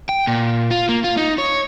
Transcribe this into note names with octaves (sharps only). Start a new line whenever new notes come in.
G5
A#2
F4
A#3
F4
D#4
C#5